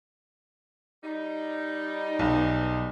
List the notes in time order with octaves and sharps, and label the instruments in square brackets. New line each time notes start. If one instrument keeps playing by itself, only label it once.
[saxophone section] G3 D#4
[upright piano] B1